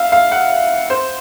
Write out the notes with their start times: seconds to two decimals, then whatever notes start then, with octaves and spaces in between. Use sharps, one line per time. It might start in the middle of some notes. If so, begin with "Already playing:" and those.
Already playing: E5 F5
0.12 F5
0.31 F#5
0.90 C5